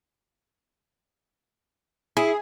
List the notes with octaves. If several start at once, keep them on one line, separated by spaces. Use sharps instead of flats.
E4 G#4